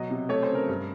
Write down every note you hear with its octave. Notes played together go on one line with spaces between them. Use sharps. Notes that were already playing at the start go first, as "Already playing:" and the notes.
Already playing: B2 F#3 D#5
C3
A3 C#5
C5
C#3
A#4
G2